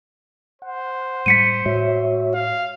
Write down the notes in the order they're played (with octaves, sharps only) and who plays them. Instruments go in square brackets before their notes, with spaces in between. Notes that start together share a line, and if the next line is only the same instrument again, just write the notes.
[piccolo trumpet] C5 [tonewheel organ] F#5
[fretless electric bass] A2 G3 G#3 [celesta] B6 C#7 D#7
[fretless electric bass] A2 G#3 [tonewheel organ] F#4 C#5 E5
[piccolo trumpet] F5